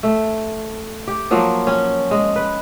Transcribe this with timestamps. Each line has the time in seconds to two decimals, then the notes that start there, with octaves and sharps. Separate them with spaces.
0.03 A3
1.07 G4
1.31 F3 F#3 A#3 F4
1.67 C#4
2.11 G#3
2.36 B4